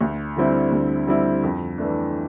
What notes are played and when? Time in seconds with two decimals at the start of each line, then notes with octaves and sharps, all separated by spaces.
0.01 D2
0.37 D3 G3 C4 E4
0.72 D2
1.07 D3 G3 C4 E4
1.43 F2
1.78 E3 A3 D4